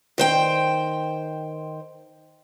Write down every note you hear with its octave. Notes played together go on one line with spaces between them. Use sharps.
D#3 C5 G5